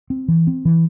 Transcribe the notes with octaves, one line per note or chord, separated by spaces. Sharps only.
C4
E3
C4
E3